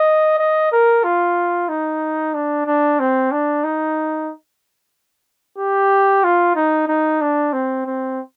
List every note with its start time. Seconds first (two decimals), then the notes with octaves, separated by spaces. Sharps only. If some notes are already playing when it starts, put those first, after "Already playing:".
Already playing: D#5
0.39 D#5
0.72 A#4
1.04 F4
1.69 D#4
2.34 D4
2.66 D4
2.99 C4
3.32 D4
3.64 D#4
5.58 G4
6.24 F4
6.56 D#4
6.88 D#4
7.21 D4
7.53 C4
7.86 C4